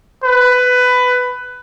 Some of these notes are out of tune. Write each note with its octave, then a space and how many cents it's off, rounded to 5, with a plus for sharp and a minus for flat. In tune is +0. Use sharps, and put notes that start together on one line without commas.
B4 +15